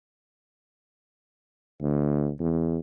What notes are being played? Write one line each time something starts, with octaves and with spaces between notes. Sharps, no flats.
D2
E2